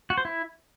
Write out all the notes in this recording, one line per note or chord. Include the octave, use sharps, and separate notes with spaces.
F#4
C5
E4